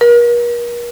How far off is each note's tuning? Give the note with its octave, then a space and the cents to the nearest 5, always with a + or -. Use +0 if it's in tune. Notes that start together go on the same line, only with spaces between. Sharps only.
A#4 +40